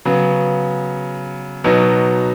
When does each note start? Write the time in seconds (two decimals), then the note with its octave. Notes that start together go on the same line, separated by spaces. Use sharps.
0.05 C#3 F#3 B3
1.64 B2 F#3 B3 D#4